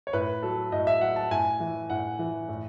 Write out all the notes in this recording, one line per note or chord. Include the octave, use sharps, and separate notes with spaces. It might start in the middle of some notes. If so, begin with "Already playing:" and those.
C#5
A2 B4
F#3 A4
A2 D#5
E5
F#3 F#5
A5
A2 G#5
E3
A2 F#5
E3
A2